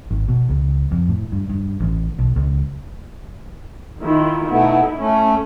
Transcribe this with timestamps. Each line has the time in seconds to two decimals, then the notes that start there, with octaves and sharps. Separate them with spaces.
0.10 G#1
0.28 B2
0.49 C#2
0.92 F2
1.09 A2
1.32 G2
1.50 G2
1.80 A1
2.19 B1
2.36 C#2
4.01 D#3 E4 F4
4.50 B2 A3 B3 D#4 E4
4.99 A3 C#4